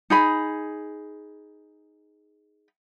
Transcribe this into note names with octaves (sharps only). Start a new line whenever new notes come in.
D#4 G#4 B5